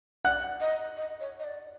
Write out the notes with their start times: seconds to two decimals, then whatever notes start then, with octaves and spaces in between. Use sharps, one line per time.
0.25 D5 F#5 F#6
0.61 D#5
0.97 D#5
1.20 C#5
1.39 D#5
1.44 D5